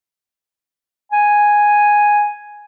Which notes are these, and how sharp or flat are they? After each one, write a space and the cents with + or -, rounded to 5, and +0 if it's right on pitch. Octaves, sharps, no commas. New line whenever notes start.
G#5 +0